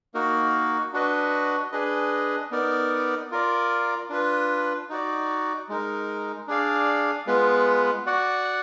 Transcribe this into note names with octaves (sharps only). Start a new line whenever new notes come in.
A#3 D#4 F#4 A#4
D4 F#4 B4 D#5
D4 G#4 B4 D#5
B3 D#4 A#4 D5
F4 A#4 D5
D4 F4 B4
D#4 F#4 D5
G#3 D#4 A#4
D4 G#4 D5 F5
G#3 B3 F4 B4
F#4 D5 F#5